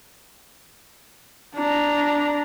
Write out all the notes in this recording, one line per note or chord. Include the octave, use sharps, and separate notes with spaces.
D4 A#5